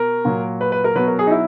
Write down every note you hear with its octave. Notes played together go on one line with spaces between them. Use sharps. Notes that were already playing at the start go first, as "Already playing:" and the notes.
Already playing: B2 A#4
A#2 F#3
B4
B4
A#4
B2 F#3 B4
A#4
G#4
D#4
E4